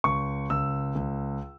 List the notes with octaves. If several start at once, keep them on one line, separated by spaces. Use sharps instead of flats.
C#2 C#6
C#2 E6
C#2